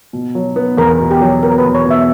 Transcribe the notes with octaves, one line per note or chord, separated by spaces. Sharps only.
B2
F#3
B3
E2 A#4
B2
G4
F#3
B3 A#4
B4
E2
C#5
B2 E5